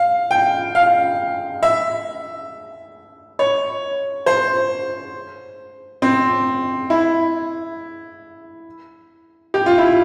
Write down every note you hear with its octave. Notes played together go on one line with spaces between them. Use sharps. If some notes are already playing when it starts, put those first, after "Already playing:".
Already playing: F5
G5
F5
E5
C#5
C5
C4
E4
G4
F4
E4